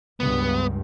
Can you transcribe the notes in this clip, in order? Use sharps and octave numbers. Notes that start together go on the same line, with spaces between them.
C#2 G2 B3